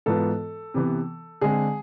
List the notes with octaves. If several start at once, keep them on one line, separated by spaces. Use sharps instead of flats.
G#2 E3 B3 F4 A4
C3 E3 B3
D3 G#3 C4 G#4